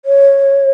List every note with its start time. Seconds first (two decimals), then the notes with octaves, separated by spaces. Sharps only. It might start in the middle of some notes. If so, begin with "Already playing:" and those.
0.05 C#5